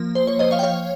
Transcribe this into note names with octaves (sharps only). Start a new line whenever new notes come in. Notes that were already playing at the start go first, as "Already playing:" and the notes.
Already playing: F3 A#3
C5
C#5
C5 D#5
C#5 F5
G5
C#5 F5